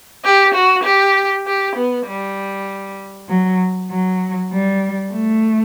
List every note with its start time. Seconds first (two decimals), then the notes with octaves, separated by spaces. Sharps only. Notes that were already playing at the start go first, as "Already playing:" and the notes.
0.24 G4
0.54 F#4
0.85 G4
1.46 G4
1.76 B3
2.07 G3
3.29 F#3
3.89 F#3
4.50 G3
5.12 A3